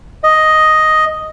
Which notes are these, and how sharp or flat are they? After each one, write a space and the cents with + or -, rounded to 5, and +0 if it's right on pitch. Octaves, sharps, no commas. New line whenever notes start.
D#5 +5